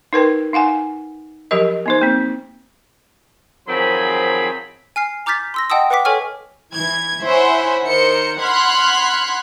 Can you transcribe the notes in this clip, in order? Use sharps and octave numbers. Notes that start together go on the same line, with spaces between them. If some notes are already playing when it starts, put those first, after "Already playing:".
D#4 A#4 B4 G5
D#4 F5 F#5 G#5
F3 F#3 G4 A#4 D#5
B3 D#4 C5
A#3 C4
D#3 F3 F#3 C4 G#4 B5
G#5 F6 C7
A#5 D6 F6 G6 A6 B6
C6 E6 A#6
D#5 F#5 G5 A5 D#6 E6
B4 F#5 G5 D6 B6
A4 C#5 G#5 C#6 F6
E3 G#6
E4 C5 C#5 E5 F#5 G#5
D#3 A#4 C5 G6 C#7
F#5 B5 C6 F6 F#6 G#6